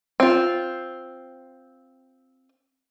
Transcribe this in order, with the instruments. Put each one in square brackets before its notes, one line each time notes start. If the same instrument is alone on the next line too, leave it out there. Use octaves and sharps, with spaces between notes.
[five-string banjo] C4 F4